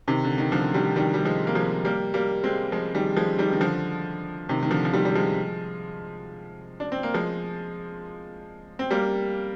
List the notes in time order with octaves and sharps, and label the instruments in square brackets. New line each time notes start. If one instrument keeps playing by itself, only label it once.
[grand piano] C3 D#3
D3
D#3
D3 F3
D#3 G3
D#3 G3
G3
F3 G#3
A#3
F3 G#3
G3 A#3
G3 A#3
G#3 C4
F3 G#3
D#3 G3
F3 G#3
D#3 G3
D#3
D3 F3
C3 D#3
D#3
D3 F3
F3
D#3 G3
G3
F3 G#3
D4
C4
A#3
F3 G#3
C4
G3 A#3